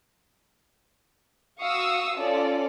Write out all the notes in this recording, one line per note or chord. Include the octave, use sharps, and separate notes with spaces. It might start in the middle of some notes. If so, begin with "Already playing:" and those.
F#4 F5 C#6 D#6 E6
C#4 F4 A4 D5